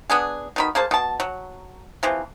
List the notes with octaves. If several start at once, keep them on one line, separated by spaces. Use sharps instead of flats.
B3 D4 G#4
B2 D#3 B5
A#3 G#4 C5 A5
B2 A5
F#3
C3 E3 F3